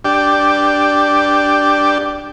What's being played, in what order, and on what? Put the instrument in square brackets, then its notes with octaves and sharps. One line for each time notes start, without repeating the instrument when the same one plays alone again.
[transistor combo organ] D4 G4